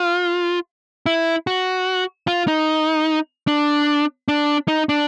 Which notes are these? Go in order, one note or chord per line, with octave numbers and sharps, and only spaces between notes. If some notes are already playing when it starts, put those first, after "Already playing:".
Already playing: F4
E4
F#4
F4
D#4
D4
D4
D#4
D4